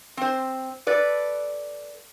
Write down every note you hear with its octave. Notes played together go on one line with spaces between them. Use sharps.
C4 C5
A4 B4 D5